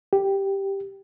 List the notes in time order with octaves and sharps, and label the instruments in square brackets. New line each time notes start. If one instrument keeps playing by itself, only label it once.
[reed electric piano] G4